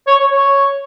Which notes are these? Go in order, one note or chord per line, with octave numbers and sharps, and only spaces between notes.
C#5
C#5
C#5